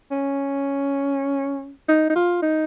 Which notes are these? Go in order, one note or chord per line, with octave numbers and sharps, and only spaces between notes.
C#4
D#4
D#4
F4
D#4